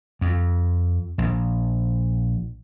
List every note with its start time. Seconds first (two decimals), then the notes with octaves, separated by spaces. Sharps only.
0.21 F2
1.18 A#1